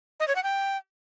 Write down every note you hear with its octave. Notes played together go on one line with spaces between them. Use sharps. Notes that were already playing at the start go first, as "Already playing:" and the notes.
D#5
C#5
F#5
G5